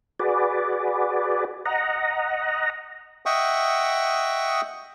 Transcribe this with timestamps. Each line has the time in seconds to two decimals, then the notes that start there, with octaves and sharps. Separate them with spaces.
0.20 F#4 G#4 B4 D5
1.66 D#5 F#5 A#5
3.26 D#5 E5 F#5 G5 C#6 D#6